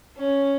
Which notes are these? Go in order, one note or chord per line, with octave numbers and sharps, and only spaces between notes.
C#4